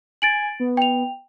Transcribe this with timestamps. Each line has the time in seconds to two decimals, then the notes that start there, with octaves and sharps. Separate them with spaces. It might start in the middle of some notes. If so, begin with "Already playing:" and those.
0.22 G#5 A6 D7 F#7
0.60 B3
0.77 G5 F7